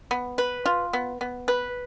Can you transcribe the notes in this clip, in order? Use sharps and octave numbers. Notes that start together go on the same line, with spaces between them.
B3
B4
F4
B3
B3
B4